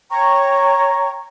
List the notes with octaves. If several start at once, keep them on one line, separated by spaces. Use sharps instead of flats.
C#5 G5 A#5 C#6